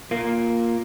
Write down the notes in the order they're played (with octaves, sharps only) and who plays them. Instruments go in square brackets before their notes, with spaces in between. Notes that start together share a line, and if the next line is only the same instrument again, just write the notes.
[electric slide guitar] A#2 A#3